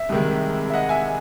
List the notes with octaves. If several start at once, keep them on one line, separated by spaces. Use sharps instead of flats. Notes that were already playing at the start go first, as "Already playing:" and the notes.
Already playing: E5
C2 C3 D#3 G#3
E5
D#5 F#5
E5 G#5